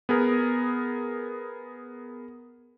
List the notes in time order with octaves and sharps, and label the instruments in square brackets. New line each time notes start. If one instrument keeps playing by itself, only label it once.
[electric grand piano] B3 G#4 A#4